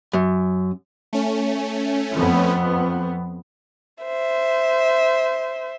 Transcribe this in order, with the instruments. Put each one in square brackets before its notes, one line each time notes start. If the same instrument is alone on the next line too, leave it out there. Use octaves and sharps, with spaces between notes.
[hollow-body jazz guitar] F#2
[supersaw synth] A3 C#4
[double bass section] F2 B3
[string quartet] C5 E5